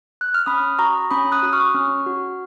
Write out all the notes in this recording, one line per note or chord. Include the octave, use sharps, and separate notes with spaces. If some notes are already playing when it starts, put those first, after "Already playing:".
F#6
F6
C#4 B5 D#6
F#4 A#5 C#6
C#4 B5 D#6
D#6 F#6
F#4
C#6 F6
C#4
F#4